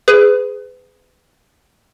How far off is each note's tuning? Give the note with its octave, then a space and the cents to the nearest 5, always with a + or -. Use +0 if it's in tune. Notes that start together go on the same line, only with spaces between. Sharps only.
G#4 +0 B4 +30